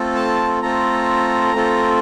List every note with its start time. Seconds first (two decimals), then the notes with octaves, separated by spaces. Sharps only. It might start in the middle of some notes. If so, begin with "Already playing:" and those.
Already playing: A3 C4 F4 A4
0.16 A5
0.62 A3 C4 F4 A4 A#5
1.53 A3 C4 F4 A4